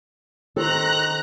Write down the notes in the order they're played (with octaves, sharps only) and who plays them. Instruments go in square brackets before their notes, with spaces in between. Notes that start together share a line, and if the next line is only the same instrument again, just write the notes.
[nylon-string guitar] D#3 A4 C5 [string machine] A#5 F#6